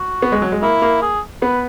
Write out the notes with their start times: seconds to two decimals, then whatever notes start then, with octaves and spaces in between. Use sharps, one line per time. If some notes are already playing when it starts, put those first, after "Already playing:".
Already playing: F#4
0.22 B3
0.32 G#3
0.42 F#3
0.52 G#3
0.62 A#3 E4
0.82 A#3
1.02 G#4
1.42 B3 B4